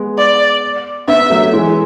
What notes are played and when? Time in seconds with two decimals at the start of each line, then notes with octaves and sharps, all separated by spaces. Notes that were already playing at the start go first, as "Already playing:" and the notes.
Already playing: G#3 B3
0.18 D5
1.08 B3 D4 E5
1.30 F#3 A3
1.42 A3
1.53 E3 G#3